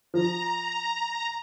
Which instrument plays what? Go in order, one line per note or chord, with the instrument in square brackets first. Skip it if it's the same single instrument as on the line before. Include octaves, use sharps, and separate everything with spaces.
[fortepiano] F3 [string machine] A#5